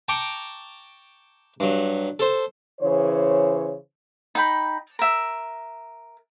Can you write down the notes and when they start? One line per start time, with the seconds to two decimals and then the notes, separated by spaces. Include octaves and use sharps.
0.08 G5 A5 A#5 C#6 D6
1.60 G2 F#3
2.19 A4 C5
2.81 C#3 E3 C5 C#5
4.35 D#4 G5 B5
4.99 A#4 E5